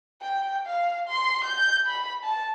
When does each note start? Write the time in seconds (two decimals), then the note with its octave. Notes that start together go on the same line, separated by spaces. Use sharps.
0.22 G5
0.67 F5
1.08 C6
1.45 G6
1.87 B5
2.24 A5